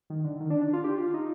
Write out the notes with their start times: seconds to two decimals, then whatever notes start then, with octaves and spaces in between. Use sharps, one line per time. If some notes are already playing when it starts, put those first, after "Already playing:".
0.10 D#3
0.24 D3
0.40 D#3
0.50 D4
0.61 D4
0.73 F4
0.84 G4
0.98 F4
1.14 D#4